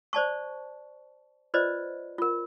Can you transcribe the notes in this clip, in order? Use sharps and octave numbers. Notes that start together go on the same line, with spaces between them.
C5 D5 A5 C#6
F4 B4 C5 D5 D#5
F4 A#4